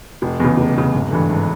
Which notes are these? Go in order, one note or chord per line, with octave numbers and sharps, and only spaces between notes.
F1
E2 C#3
F1
E2 C#3
G#1
G2 E3 A3
G#1